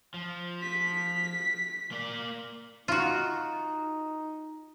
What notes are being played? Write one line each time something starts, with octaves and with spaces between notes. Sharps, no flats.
F3
B6
A#3 D5
D#4 F4 F#4